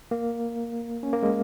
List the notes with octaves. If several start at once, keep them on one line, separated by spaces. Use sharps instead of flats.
A#3
C#4
A#3
G#3